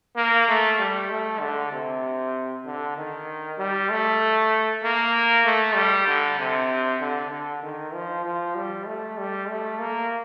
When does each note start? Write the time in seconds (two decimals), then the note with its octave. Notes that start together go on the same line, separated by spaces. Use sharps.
0.16 A#3
0.49 A3
0.79 G3
1.10 A3
1.41 D3
1.72 C3
2.65 D3
2.97 D#3
3.58 G3
3.90 A3
4.83 A#3
5.46 A3
5.75 G3
6.07 D3
6.39 C3
7.01 D3
7.31 D3
7.63 D#3
7.94 F3
8.25 F3
8.55 G3
8.87 A3
9.18 G3
9.49 A3
9.79 A#3